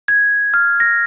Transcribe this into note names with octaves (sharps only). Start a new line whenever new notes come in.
G#6
F6
A#6